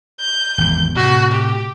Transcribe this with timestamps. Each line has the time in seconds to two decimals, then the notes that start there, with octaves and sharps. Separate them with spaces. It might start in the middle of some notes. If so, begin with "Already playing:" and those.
0.20 G6
0.58 G#1 E2
0.96 A2 C3 F#4
1.32 G4